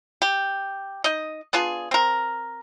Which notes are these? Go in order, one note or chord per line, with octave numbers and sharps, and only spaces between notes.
G4
D#4 D#5
B3 D4 F4 G#4
C4 A#4